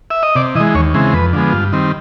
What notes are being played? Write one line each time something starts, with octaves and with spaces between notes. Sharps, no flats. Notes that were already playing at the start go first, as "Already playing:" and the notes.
E5
D#5
C3 D5
E3 G#3 D#5
D#2 C#5
C#3 E3 G#3 C4
F2 B4
D3 F3 G#3 B3
G2 F4
D#3 G3 C4